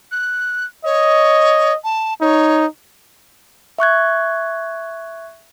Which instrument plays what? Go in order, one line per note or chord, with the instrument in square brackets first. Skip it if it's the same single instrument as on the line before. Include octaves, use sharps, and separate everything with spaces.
[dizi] F#6
[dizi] C#5 [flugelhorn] D#5
[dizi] A5
[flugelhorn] D#4 [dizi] C#5
[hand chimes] E5 C#6 F#6 G#6